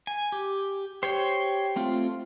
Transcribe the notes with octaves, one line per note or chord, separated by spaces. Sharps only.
G#5
G4
G4 C5 C#5 G5
A3 C4 F4